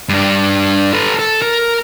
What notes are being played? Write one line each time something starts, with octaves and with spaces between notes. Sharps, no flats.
G2 D4
A4 B4
A4
A#4